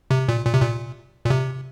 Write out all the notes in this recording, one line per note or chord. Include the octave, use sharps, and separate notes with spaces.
C3
A#2
A#2
C3
A#2
A#2
C3